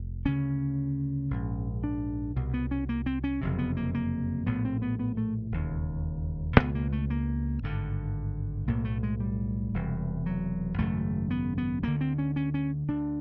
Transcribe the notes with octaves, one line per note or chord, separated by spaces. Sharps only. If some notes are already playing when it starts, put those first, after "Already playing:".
Already playing: F1
D2 C#3 C#4
A#1 G#2
D4
C2 B2
B3
C#4
A#3
C4
C#4
F#1 F2 C3
B3
A#3
A#3
A#1 A2 B3
C4
B3
B3
A3
E1 D#2 C#3
C#2 B2 B3
A#3
A3
A#3
G#1 G2 D3
B1 A2 A#3
A3
G#3
G3
E1 E2 C3
F#3
G#1 F#2 C#3 A3
B3
B3
D2 D3 A#3
C4
C#4
C#4
C#4
D2 D3 D4